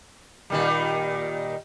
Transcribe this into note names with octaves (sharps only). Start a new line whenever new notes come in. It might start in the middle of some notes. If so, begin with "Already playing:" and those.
A#2 D#3 G3